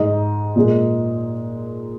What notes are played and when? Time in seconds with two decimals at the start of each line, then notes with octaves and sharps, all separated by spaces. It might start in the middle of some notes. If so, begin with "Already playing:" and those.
Already playing: G#2 G#3 D#5
0.56 A#2 G#3